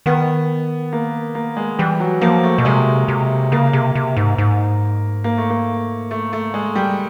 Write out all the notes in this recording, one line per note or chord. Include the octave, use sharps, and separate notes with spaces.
D#3 B3
A#3
A#3
G#3
E3 G3
F#3
F3 A#3
A3
B2
C3 G#3
C3
C#3 A#3
C3
C3
G#2
G#2
A#3
A3
A#3
A3
A3
G#3
G3